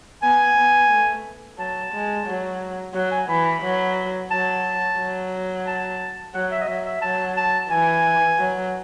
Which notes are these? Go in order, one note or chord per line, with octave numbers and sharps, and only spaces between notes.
B3 G#5
B3
A3
F#3 A5
G#3
F#3
F#3 F#5
G#5
E3 B5
B5
F#3
F#3 A5
F#3
A5
F#3 F#5
E5
D#5
F#3 E5
E5
F#3 A5
A5
E3 G#5
F#3